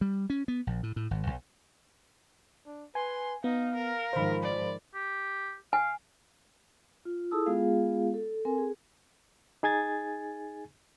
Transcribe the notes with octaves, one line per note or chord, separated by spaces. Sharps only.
G3
C#4
B3
A#1
A2
A2
G#1
B1
D4
B4 G#5 C6
B3 D#4 F5
A#4
G#2 D#3 F3 C5 B5
D5
G4
F5 G#5
F4
E4 G#4 A4 A5 D#6 E6
G#3 B3 F4 G#4 F5
A4
C4 A4 A#4 G#5
G#4
D#4 G#4 G#5 G#6 A6